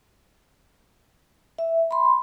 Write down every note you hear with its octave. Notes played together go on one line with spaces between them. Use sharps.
E5
B5 C6